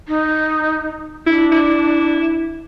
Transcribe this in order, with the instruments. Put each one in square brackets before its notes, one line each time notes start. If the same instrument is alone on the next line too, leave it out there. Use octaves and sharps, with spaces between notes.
[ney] D#4
[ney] D4 [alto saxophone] E4
[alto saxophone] E4